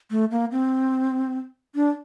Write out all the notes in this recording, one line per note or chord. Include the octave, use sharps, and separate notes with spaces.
A3
A#3
C4
D4